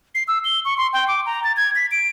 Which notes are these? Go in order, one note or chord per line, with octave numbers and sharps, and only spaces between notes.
C7
E6
G7
C#6
C6
G5
D6
A#5
A6
G#6
B6
D7